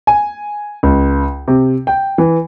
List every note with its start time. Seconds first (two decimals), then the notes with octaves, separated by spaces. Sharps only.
0.07 G#5
0.83 C#2
1.48 C3
1.87 G5
2.18 E3